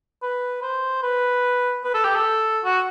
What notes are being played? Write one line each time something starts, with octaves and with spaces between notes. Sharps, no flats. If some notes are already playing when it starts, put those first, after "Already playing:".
B4
C5
B4
B4
A4
G4
A4
F#4